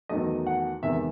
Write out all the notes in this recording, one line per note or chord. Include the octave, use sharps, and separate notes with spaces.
E2 D#3 F#3 A3 D#5
F#5
E2 C3 D#3 G#3 E5